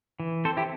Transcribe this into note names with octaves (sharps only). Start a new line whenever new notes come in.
E3
C4 A4 C5
E4 G4